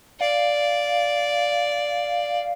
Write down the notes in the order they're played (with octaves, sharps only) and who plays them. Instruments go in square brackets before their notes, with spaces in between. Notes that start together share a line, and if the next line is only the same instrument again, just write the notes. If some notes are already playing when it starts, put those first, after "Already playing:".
[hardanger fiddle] D5 [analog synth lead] F5